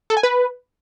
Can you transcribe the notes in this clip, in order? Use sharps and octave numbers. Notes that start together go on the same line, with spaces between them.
A4
G#5
B4